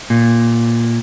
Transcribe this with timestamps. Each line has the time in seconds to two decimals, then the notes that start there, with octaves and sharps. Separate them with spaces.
0.10 A#2